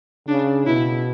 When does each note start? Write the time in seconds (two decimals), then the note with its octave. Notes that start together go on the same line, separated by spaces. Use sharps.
0.28 C#3 D4
0.67 B2 E4